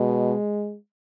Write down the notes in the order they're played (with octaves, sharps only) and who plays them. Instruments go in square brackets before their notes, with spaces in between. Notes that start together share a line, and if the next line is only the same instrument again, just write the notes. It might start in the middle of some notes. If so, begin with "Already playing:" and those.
Already playing: [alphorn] B2 [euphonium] G#3